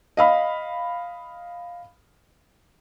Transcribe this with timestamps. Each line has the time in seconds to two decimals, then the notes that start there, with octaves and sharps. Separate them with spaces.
0.17 D#5 F5 B5